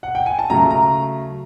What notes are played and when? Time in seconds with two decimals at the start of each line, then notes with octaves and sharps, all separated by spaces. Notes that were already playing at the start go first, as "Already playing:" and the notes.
0.03 F#5
0.15 G5
0.26 G#5
0.39 A5
0.50 C#3 F#3 A3 A#5
0.71 A#5